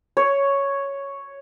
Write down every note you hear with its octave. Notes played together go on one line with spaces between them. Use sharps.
C#5